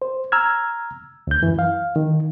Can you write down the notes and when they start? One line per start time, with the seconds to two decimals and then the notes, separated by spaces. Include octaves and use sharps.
0.02 C5
0.32 A#5 E6 F6 G#6
1.27 D2 G6
1.42 F#2 E3
1.59 F5
1.96 D#3